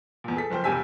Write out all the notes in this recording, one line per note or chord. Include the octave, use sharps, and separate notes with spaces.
E2 A#2
G#4 A4 B6
F#1 F3 C5 G5
E1 C2 G4 G#5 E6 B6